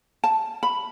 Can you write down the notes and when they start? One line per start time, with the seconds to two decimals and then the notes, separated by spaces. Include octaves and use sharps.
0.24 A5
0.63 B5